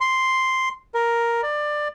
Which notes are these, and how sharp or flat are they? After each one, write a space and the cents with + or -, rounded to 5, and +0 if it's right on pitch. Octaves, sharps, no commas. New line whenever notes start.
C6 +0
A#4 +5
D5 +20